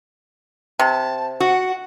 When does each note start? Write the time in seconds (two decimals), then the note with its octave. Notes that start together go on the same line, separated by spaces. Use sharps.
0.79 C3 A5
1.40 F#4 F#5